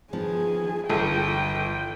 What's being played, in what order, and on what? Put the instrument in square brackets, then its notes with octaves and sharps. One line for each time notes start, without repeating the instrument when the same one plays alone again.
[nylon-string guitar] D#3 F3 B3 [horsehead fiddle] G#4
[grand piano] G1 [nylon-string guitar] F4 A4 [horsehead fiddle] G5